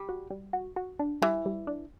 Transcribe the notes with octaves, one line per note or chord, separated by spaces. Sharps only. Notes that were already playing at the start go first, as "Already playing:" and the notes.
Already playing: G3
F#4
G3
F#4
F#4
D4
E3 G3
G3
D4